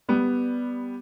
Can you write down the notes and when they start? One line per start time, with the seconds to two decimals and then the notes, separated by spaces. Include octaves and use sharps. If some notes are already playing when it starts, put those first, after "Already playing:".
0.09 G3 B3